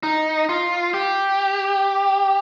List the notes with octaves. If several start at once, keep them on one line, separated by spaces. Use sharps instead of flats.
D#4
F4
G4